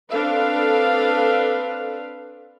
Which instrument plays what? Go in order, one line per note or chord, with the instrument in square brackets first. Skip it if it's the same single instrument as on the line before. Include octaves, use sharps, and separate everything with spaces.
[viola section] C4 D4 A4 B4 F5